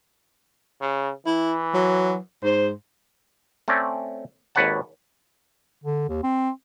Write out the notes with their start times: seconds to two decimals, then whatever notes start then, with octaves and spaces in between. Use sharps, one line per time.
0.81 C#3
1.26 E3 E4
1.74 F#3
2.43 G#2 C5
3.68 A3 C4 C#4 D5
4.55 G#1 D#2 B4 C#5 F#5 A5
5.84 D3
6.09 D#2
6.23 C4